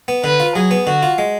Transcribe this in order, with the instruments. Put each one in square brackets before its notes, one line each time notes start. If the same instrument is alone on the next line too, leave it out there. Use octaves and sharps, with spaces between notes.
[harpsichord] B3
[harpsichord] D3 [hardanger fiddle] B4
[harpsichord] F4
[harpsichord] F#3 [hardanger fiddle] G#4
[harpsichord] B3
[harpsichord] D3 [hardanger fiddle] F#4
[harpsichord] F4
G#3